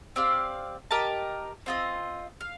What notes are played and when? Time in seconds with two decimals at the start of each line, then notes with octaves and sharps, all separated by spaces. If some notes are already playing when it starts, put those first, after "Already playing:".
0.16 C4 G4 D5 F5
0.91 G4 A#4 D#5 A5
1.66 C4 F4 C5 D#5
2.41 F5